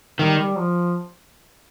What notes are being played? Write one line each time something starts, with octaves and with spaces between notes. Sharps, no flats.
D#3 G3
G3
F3